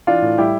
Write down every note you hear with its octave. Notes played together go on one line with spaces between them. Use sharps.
E3 D4 F4
A2
G3 E4 G4